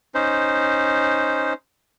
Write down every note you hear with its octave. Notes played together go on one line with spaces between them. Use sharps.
C#4 D#4 C5